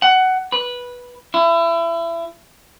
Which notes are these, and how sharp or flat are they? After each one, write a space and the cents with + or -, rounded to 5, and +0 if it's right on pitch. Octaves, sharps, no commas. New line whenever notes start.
F#5 +15
B4 -10
E4 +30